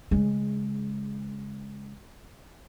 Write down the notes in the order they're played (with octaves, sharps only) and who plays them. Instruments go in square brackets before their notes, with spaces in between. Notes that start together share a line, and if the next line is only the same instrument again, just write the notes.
[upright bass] C#3 G#3